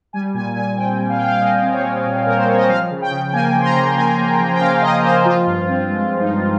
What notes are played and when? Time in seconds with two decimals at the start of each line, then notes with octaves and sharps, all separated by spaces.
0.13 G3 G#5
0.34 A#2 G#5
0.56 A#2 G#5
0.77 C4 G5
0.99 G3
1.09 F5
1.18 A#2 G5
1.28 F5
1.41 A#2 D#5
1.63 C4
1.73 C#5
1.84 G3
2.06 A#2
2.26 A#2 A#4
2.37 C5
2.48 C4 C#5
2.58 D#5
2.69 F3 F5
2.91 C#3
3.02 G5
3.11 C#3
3.33 A#3 G#5
3.55 F3
3.60 C6
3.65 A#5
3.76 C#3
3.97 C#3 G#5
4.18 A#3
4.40 F3
4.54 G5
4.60 C#3 F5
4.82 C#3 D#5
5.04 A#3 C5
5.25 F3 F4
5.47 G2
5.68 C4
5.89 G#3
6.11 F3
6.21 D#4
6.31 G2